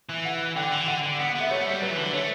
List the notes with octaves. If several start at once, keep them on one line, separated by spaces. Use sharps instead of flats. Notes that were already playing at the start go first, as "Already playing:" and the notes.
E3
F#5
D3 G5
E3
D3 F#5
D3
B3 F#5
F#5
B3 E5
A3 C#5
G3
F#3 B4
E3
D3
A3 C#5